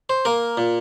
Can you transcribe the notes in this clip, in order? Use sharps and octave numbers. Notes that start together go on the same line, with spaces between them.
C5
A#3 A#4
A#2